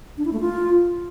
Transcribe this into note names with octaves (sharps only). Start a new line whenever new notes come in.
D4
E4
A3
F4